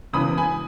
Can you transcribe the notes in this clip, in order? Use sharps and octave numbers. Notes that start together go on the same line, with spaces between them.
E1 E2 C#3 E3 B5 D#6
G#5 B5